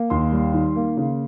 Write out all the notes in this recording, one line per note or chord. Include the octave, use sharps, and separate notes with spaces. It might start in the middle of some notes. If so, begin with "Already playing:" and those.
Already playing: A#3
D#2 C6
G3
D#3
A#3
C#3